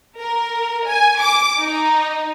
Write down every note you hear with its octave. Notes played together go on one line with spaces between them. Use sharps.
A#4
G#5
D6
D#4